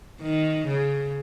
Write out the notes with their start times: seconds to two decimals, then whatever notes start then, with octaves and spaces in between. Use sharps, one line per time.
0.22 D#3
0.68 C#3